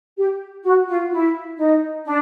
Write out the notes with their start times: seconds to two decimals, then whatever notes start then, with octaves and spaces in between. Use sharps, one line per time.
0.17 G4
0.64 F#4
0.87 F4
1.11 E4
1.57 D#4
2.05 D4